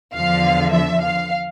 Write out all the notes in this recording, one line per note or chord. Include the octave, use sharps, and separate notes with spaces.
E2 D3 F3 F5
E5
F5